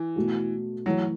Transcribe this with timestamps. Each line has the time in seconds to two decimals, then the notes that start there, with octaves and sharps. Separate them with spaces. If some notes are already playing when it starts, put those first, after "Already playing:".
Already playing: E3
0.16 B2 A3 F#4
0.86 E3 F#3 A3 E4